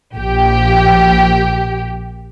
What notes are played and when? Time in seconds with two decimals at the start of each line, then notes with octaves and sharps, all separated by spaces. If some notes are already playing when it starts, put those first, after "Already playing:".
0.14 A#1 G4